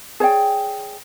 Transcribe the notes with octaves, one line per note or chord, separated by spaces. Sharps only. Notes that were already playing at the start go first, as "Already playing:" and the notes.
G#4 C#5 D5 G5